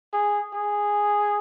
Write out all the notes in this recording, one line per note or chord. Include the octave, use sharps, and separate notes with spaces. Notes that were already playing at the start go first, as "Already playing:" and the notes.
G#4
G#4